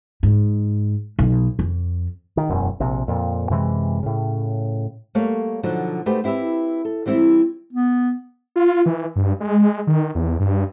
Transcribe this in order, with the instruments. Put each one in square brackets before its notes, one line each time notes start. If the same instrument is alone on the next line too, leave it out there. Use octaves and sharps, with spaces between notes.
[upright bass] G#2
B1
F2
[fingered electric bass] D#3
E1 F#2
A#1 C3
F2 A#2
F#2 C3 E3 G#3
A2 C#3
[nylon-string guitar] G3 A3 A#3 C#5 F5
B2 D3 F3 F#3 D#4 F#4
A3 D#4 F#4 G4 B4 C5
C4 E4 G4 B4 E5
A4
E3 G3 C4 E4
[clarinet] B3
[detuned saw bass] F4
E3
G2
G#3
D#3
E2
G2